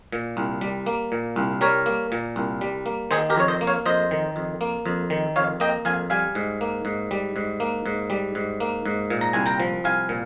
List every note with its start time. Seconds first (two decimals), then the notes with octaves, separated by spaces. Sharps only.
0.12 A#2
0.37 C2
0.61 G3
0.86 A#3
1.12 A#2
1.36 C2
1.61 G3 A#4 C#5
1.86 A#3
2.12 A#2
2.36 C2
2.61 G3
2.86 A#3
3.11 D#3 G#4 C5
3.30 G4 A#4
3.36 F2 C#5
3.48 C5 D#5
3.61 A#3
3.67 C#5 F5
3.86 F2 C5 D#5
4.11 D#3
4.36 F2
4.61 A#3
4.86 F2
5.10 D#3
5.36 F2 C#5 F5
5.60 A#3 D#5 G5
5.85 F2 F5 G#5
6.10 G3 F5 G#5
6.35 G#2
6.61 A#3
6.85 G#2
7.11 G3
7.36 G#2
7.60 A#3
7.86 G#2
8.10 G3
8.35 G#2
8.60 A#3
8.86 G#2
9.10 A#2
9.21 A#5
9.33 C2 G#5
9.46 G5 A#5
9.60 F3
9.84 C2 F5 G#5
10.09 A#2